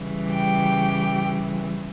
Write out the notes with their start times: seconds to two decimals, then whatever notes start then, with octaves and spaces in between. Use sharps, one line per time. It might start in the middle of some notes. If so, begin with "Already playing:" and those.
Already playing: C#3 E3 G3
0.31 G4 G5